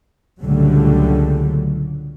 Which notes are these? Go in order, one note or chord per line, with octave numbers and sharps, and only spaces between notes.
C#2 A#2 D3 F#3 G3 A3